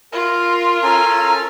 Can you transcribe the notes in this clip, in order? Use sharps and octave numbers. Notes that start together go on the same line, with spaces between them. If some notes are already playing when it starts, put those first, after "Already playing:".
F4 A#4
C#4 A4 G#5 A#5